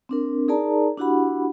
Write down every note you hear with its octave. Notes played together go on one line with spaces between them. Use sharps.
C4 D4 A#4
D#4 G#4 A#4 D5 A5 A#5
D4 E4 F#4 G4 F#5 B5